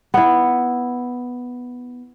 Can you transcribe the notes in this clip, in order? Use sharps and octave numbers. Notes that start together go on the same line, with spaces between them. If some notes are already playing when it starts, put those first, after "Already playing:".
B3 E4